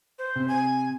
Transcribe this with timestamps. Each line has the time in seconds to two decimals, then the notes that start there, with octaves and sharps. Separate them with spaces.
0.19 C5
0.36 C3
0.48 G#5